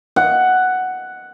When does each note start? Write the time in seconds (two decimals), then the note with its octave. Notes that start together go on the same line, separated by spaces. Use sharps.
0.16 F#5